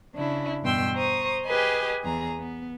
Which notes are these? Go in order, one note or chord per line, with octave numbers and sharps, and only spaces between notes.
C#3 D4 E4
E2 G2 B2 G5 C6 E6
C5 A#5 C#6 D#6
G4 G#4 B4 D#5 G#5
E2 G#4 A#5
B3